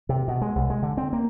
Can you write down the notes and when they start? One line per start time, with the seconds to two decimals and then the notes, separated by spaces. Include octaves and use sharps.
0.09 C3
0.28 B2
0.42 G#3
0.55 C2
0.70 G#3
0.83 D3
0.97 C4
1.13 A#3